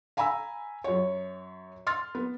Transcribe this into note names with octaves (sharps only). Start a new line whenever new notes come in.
F5 G#5 A#5 B5 E6
F#2 C#5
C6 F6 A6
B3